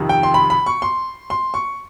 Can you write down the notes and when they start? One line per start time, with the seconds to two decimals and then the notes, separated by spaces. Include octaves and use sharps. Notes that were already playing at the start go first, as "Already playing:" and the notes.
Already playing: F2 C3 D#3
0.09 G5
0.23 C6
0.34 B5
0.50 B5
0.66 C#6
0.82 C6
1.30 C6
1.54 C#6